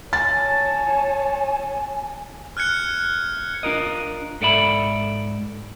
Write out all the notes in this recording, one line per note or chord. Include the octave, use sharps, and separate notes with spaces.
C#5 G#5 A5 A6
F6 F#6 G#6 C#7
D4 F4 A#4 D#5
G#2 A4 D5 E5 B5